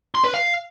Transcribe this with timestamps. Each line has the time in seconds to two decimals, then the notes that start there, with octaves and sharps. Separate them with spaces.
0.15 C6
0.24 B4
0.34 F5